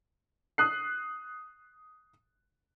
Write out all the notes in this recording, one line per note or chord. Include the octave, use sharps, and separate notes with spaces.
D#6 F#6 C7